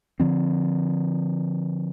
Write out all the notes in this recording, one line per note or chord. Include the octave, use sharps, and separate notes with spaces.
D3 F3 C4